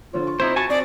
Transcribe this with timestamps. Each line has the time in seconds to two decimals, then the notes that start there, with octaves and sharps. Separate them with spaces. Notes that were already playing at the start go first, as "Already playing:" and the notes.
0.13 D3 F3 F4 C#5
0.27 C#6
0.40 C4 D#4 E4 C5
0.56 F#4 G#5 A5 B5 C#6 A6
0.70 C4 G#4 D5